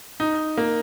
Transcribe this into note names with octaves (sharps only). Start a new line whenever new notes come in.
D#4
A#3